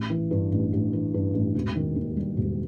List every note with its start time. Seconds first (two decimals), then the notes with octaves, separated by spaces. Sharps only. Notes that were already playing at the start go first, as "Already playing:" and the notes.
Already playing: A1
0.10 E3
0.31 G2
0.52 A1
0.73 A1
0.93 E3
1.14 G2
1.34 A1
1.55 E1
1.75 D#3
1.96 D#2
2.17 G3
2.37 E1